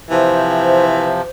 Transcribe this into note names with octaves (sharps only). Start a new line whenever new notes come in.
C3 E3 F3 C5